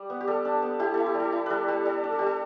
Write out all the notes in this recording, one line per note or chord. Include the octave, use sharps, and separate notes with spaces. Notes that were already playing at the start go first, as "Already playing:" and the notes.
Already playing: G3
B3
G4
G3 A4
D4
B3
E4 G4
E4 A4
G4
G3
A4
E4
G3 A4 B4
G3 G4
G3 A4
D4
A4
G3 G4
A4